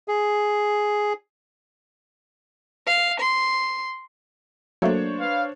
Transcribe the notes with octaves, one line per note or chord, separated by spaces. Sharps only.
G#4
F5
C6
F#3 A3 A#3 D4 C5 C#5
B4 F5